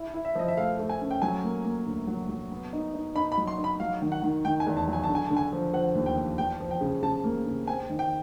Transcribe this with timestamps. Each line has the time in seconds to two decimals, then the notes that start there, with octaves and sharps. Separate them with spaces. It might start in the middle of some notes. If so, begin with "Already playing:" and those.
Already playing: E4
0.14 E4
0.25 E5
0.35 F3 D#5
0.48 E5
0.57 A3 F5
0.79 A3
0.89 G#5
1.00 C#4
1.11 G5
1.22 F#3 G#5
1.44 A#3
1.64 A#3
1.86 D2
2.07 F#3
2.29 F#3
2.51 B3
2.73 D#4
2.94 D#4
3.15 D#4 B5
3.32 B5
3.37 F#3
3.47 C6
3.58 D#4
3.64 B5
3.80 F#3 F5
4.02 D#3
4.12 F#5
4.23 D#3
4.45 D#3 G5
4.60 G#5
4.67 E2
4.77 A5
4.88 F#3
4.93 G#5
5.04 D3 A5
5.15 G#5
5.26 D3 A5
5.37 G#5
5.53 F3
5.73 F3 F#5
5.95 D#2
6.06 G5
6.17 F3
6.38 E2 G5
6.60 F3
6.71 G5
6.81 C#3
7.02 C#3 A5
7.24 A#3
7.46 C#3
7.67 C4 G#5
7.89 D#3
7.99 G5